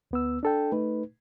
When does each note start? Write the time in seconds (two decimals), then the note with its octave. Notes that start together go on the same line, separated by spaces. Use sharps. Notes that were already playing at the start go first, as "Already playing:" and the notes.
0.11 D2 B3 E6
0.43 D4 A4 G5
0.72 A3 D#4 B4